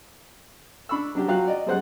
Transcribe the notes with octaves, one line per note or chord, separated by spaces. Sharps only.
D4 B5 C#6 E6
F#3 D4 G4
F#3 F4 F#4 F5 G5 F#6
D5 D#5
F#2 G3 G#3 C5 F#5 F#6